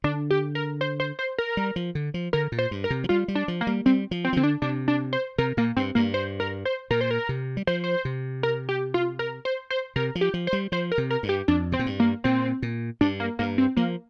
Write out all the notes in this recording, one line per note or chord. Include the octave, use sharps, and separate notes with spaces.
D3 D4
G4
A#4
C5
C5
C5
A#4
G3
F3
D3
F3
D3 A#4
A#2
C5
G2
A#4
C3
F3
G3 F4
G3
D4
F3
A#3
G3
G3 C4
F3
C4
F3
D3 C4
D4
C3 D4
D4
C5
C3 A#4
A#2 A#3
G2 C4
G2 A#3
C5
A#4
C5
A#2 A#4
C5
A#4
C3
G3
F3 C5
C5
C3
A#4
G4
F4
A#4
C5
C5
C3 A#4
F3
G4
F3
C5
G3
F3 C5
A#4
C3
A#4
G2
G4
F2 D4
C3 C4
A#2
G2
A#3
A#2 C4
A#2
G2 D4
A#3
G2 A#3
C4
F3 A#3